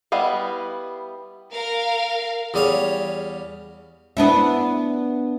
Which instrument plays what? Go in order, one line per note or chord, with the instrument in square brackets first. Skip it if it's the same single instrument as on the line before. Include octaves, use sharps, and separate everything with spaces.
[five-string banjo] G3 B3 E4 D#5 F5
[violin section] A#4 F5
[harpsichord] E2 G3 G#4 C#5 F5
[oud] B3 D4 E4